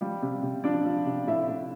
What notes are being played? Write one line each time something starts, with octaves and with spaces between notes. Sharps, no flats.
F3 G3 G4
C3
C3
F3 D4 D5
F3
C3
A2 E4 E5
A2